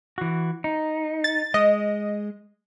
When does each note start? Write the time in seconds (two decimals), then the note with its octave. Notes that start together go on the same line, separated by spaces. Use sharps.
0.18 E3 F#4
0.64 D#4
1.24 A6
1.54 G#3 D#5